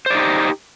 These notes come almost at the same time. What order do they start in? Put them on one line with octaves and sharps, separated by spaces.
C5 D5 D#4 G4